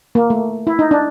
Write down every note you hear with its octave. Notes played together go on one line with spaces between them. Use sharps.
A#3
A3
E4
D#4
D4